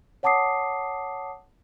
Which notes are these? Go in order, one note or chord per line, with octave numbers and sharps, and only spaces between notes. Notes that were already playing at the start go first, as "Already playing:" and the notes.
C#5 F#5 A5 D6 D#6 C7